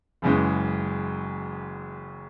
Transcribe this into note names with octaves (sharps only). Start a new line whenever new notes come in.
F#1 F#2 C#3 E3 G#3